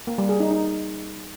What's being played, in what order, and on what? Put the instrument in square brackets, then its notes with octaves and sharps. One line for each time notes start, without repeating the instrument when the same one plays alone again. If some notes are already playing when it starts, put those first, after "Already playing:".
[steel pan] A#3
G3
G#4
D#4
D#4